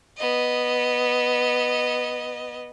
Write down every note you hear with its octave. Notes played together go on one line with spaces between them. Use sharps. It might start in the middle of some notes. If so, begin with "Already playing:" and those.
B3 D#5